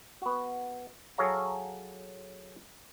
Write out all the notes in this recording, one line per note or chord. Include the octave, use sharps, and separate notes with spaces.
B3 F#4
F#3 G#4 A4 C#5 F5 A#5